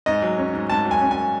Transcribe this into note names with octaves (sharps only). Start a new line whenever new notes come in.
G#2 D#5
F#3
C#4
G#2
G#2 A5
F#3
G#5
C#4
G#5